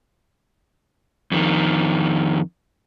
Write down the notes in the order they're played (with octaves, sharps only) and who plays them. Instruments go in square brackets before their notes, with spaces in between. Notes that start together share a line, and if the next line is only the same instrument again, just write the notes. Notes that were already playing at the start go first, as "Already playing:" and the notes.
[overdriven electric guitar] F2 D#3